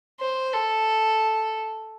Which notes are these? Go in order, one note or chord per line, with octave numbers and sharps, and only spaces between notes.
C5
A4